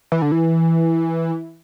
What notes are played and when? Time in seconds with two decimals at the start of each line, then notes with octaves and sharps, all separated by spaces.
0.12 E3
0.22 D3
0.32 E3